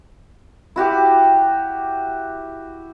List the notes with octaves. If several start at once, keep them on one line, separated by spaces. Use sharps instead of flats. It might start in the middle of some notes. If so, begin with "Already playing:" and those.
E4 F#4 G4 D6